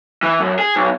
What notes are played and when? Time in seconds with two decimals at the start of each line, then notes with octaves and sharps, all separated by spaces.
0.23 E3
0.40 F#2
0.59 G#4
0.76 B1